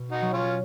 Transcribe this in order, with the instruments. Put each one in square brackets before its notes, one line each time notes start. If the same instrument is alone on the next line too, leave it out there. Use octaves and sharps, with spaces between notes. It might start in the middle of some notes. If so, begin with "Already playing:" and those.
Already playing: [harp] B2
[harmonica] D#4 F#4
[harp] F#3
[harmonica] C#4 F4